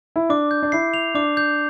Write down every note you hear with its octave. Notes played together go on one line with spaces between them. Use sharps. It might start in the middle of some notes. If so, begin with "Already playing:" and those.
E4
D4 D6
G6
D4
E4 C7
F7
D4 D6
G6